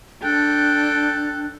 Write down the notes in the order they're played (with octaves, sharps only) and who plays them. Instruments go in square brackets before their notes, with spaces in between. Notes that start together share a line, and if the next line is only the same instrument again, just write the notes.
[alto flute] D4 [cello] A4 [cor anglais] G5 [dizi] F#6